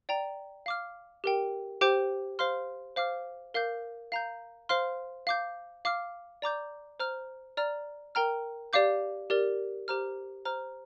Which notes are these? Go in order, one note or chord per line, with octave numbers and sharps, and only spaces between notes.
D5 G5 A#5
F5 D6 F6
G4 A#4 G5
G4 C5 G5 D6 G6
C5 F5 C6 F6
C5 F5 D6 F6
A#4 F5 D6 G6
F5 A#5 G6
C5 F5 C6 F6
F5 D6 G6
F5 D6 F6
D5 A#5 D6 G6
C5 A#5 F6
D5 A#5 F6
A#4 G5 A#5 F6
G4 D5 F5 D6 G6
G4 A#4 D5
G4 C5 A#5 F6
C5 A#5 F6